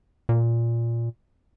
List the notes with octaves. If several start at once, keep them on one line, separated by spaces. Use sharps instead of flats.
A#2